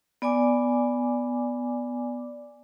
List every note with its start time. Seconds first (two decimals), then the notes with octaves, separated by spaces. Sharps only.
0.22 B3 D5 G#5 D6